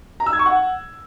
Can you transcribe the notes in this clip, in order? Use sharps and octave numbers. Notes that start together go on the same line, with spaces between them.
A#5
E6
G#6
C#6
F#5